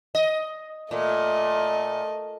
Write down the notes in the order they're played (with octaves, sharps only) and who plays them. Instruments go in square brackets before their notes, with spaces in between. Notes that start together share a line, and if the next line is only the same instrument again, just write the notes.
[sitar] D#5
[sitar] A#2 [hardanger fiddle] A3 D#5